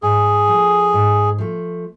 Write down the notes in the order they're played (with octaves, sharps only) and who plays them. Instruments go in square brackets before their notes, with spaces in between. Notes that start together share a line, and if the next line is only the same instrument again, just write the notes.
[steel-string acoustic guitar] G#2 [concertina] G#4
[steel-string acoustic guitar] F3 A3
G#2
F3 A3